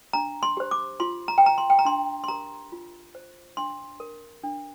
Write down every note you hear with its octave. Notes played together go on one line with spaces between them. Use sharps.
D4 A#5
C6
G4 C5
D6
F4 C6
A#5
G5
C5 A#5
C6
G5
A#5
D4 C6
C6
G4 A#4 A#5
F4
C5
D4 C6
A#4
D4